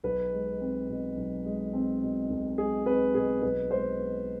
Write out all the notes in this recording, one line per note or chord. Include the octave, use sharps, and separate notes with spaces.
B1 B4
G#3
C4
B2
B1
G#3
C4
B2
B1
G#3 G#4
C4 B4
B2 G#4
B1 B4
G#3 C5
B3